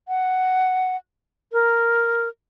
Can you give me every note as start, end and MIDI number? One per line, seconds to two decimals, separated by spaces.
0.08 0.96 78
1.52 2.28 70